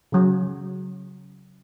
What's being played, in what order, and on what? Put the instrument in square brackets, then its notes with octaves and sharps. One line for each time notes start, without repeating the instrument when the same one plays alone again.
[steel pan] C#3 F#3